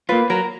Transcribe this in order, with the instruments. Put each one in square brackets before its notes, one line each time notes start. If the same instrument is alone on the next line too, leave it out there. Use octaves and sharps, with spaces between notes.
[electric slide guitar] A#3 F4 [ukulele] B4
[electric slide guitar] F#3 [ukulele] A#4